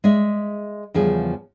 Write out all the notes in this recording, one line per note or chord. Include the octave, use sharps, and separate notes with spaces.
G#3 G#4 D5 E5
E2 C#3 F3 G3 G#4 G5